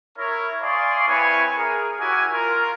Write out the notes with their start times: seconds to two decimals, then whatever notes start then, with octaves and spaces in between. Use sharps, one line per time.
0.18 E4 A#4 C#5
0.62 D5 F5 G#5 C6 C#6 D#6
1.07 C4 E4 B4 C#5 G#5
1.56 G#4 A#4
1.99 E4 F#4 G4 A#4 C#5 G#5
2.32 F4 A#4